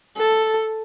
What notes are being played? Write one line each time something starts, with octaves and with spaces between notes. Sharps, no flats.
A4